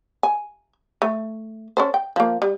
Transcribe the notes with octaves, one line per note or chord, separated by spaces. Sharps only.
G#5
A3
C#4 A4 C5
G5
F3 A#3
G3